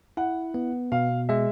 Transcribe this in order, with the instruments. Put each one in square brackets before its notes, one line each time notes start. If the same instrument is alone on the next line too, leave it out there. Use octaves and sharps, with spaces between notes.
[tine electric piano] E4 [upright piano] F#5
[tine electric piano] B3
[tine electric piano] B2 [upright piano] F5
[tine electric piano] G#3 [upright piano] E5